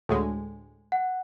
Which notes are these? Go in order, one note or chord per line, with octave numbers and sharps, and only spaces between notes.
D2 A2 G#3
F#5